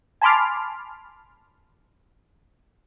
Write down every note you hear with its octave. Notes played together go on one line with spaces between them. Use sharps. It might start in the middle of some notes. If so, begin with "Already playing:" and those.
G#5 A5 B5 C6 D6 F6